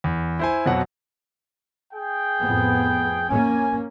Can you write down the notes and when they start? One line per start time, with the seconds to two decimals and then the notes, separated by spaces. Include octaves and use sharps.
0.04 E2
0.39 E4 C5 G#5
0.66 F2 B2 F#3 F#5
1.94 G#4 G5
2.39 F2 A2 B3
3.30 A#3 C#4 G#5